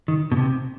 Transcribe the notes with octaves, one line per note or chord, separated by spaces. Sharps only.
D#3
B2
C3